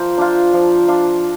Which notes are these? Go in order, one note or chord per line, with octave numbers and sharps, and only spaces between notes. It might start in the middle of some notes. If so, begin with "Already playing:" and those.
Already playing: F3 A#4 C5 D5
D4 F4
F3
D4 F4